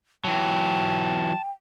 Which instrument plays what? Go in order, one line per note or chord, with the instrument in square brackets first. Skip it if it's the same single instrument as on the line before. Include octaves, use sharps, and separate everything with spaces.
[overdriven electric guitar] E3 F#3 [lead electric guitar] F#5 A5 [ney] G5